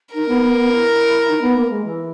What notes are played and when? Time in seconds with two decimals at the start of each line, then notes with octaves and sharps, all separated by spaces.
0.14 D#4 A#4
0.28 B3
0.42 B3
0.56 B3
0.71 E4
1.27 D#4
1.41 B3
1.56 A#3
1.70 G#3
1.84 E3